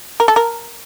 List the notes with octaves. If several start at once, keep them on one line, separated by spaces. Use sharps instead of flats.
A#4
A4
A#4